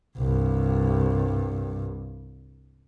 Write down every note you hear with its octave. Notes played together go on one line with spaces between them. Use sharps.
C2 G2